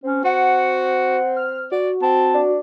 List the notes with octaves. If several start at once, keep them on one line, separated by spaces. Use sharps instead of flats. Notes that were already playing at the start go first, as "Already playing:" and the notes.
C4 C#4
C4 F#4 F#5
F6
F#4 D5
C4 A5
D4